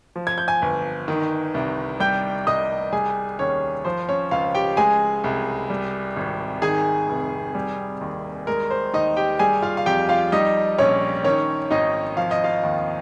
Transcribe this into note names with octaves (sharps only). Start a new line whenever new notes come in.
F3
G#6
G6
G#5 G#6
G1
D#3
C2
G3 G5 G6
C2 D#5 D#6
G3 G#4 G#5
D#2 C#4 C#5
F3 C5
C#4 C#5
C#2 F4 F5
G4 G5
G#3 G#4 G#5
C2
G3
G#1
D#3 G#4 G#5
F1
G3
D#2
G#3 A#4
C5
D#2 D#4 D#5
G4 G5
G3 G#4 G#5
F4 F5
F5
F2 G4 G5
F4 F5
G3 D#4 D#5
A#1 C#4 C#5
D#3 C#4 C#5
G#1 D#4 D#5
F3 F5
D#5
F4 F5
D#2